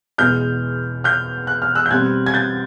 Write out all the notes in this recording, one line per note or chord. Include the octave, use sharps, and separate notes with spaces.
E2 B2 G#3 B3 F6 G6
F6 G6
F#6
F6
E6 F#6
G6
B2 G3 C4 F#6 G#6
G#6
G6 A6